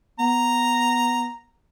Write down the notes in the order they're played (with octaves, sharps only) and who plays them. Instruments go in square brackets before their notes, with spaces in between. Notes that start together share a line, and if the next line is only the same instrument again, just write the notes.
[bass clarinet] B3 [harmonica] A#5